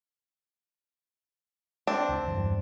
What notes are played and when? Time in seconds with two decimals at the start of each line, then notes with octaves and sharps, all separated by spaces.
1.87 C4 D4
2.09 C#2
2.27 E2 G2